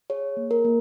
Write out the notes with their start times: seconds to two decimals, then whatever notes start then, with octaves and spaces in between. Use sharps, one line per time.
0.10 G#4 C#5
0.37 A#3
0.51 A#4
0.65 A#3